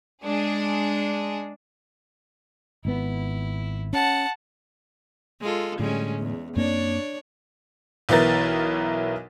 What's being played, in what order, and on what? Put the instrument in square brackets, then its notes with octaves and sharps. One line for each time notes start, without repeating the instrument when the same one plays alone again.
[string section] G#3 D4 G#4
[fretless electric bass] G#1 B3 [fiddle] E4
[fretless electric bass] C#4 [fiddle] F#5 A5
[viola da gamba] G#3 F4 A4
[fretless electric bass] A2 D3 [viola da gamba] G3 G#3 C#4
[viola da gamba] E2
[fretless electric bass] F#2 A#3 C4 [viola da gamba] D4 C#5 D5
[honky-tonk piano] B1 E3 B3 E4 A#4 A6